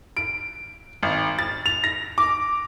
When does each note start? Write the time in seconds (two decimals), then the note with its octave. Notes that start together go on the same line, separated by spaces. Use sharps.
0.17 D7
1.03 G#1
1.39 A6
1.66 F7
1.84 A#6
2.18 D6